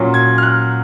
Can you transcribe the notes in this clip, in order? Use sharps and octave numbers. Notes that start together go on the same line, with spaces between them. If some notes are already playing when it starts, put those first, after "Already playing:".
Already playing: A#2 F#3 C#4
G#6
F6
F#6